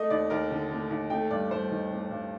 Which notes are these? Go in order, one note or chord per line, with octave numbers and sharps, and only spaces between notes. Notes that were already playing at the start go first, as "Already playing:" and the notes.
Already playing: A3 D#5
D#2 D5
D#2 A#4
D3
A3
D#2
A3 G5
G2 D5
G2 C5
D#3
A3
G2